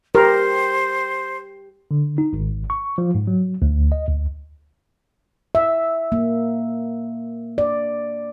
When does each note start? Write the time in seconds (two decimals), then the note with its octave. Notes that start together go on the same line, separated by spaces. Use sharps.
0.15 G4 A#4 C5
1.91 D3
2.18 D#4
2.33 G#1
2.70 C#6
2.98 F3
3.15 G#2
3.27 F#3
3.62 D2
3.92 D#5
4.08 D2
5.55 E5
6.12 A#3
7.58 D5